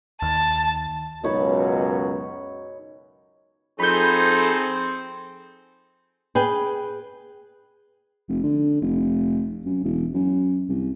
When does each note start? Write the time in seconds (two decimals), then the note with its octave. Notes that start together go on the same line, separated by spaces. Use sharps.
0.22 D#2 A5
1.24 C#2 F#2 B2 D#4 C#5 B5
3.80 F3 C4 D#4 G#4 A4 B5 G6
6.35 G#4 B4 G5
8.28 F1
8.43 D3
8.81 F1
9.66 F#2
9.84 E1
10.14 F#2
10.69 C2